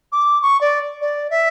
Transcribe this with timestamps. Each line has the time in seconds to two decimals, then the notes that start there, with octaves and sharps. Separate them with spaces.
0.12 D6
0.42 C#6
0.61 D5
1.01 D5
1.31 E5